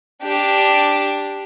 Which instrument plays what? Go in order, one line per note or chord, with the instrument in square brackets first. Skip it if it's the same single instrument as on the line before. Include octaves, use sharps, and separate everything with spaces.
[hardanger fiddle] D4 G4